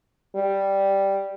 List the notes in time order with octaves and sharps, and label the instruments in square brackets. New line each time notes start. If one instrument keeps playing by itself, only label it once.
[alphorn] G3